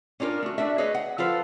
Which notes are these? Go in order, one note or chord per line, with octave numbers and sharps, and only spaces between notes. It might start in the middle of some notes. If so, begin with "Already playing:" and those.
C#4 D4 F4 G4 A#4
A3 F#4
A3 D4 F#4 D5 E5
G#4 B4 C#5 D#5
F#5
F3 F4 A4 B4 C5